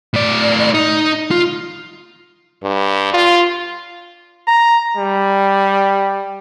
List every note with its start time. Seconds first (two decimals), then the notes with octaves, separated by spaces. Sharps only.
0.14 A2 D5
0.74 D#4
1.31 F4
2.64 G2
3.14 F4
4.48 A#5
4.97 G3